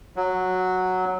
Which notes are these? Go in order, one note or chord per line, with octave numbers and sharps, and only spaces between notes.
F#3